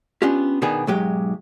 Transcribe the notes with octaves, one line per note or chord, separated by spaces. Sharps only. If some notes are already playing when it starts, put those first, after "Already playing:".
B3 C#4 D4 F4 G4
B2 D#3 B3 D4 G#4
B1 G#2 F#3 G#3 G4